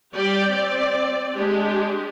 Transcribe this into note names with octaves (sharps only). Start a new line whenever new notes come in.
G3 G4 D5 G5
C4 D5
G#3 D4 G4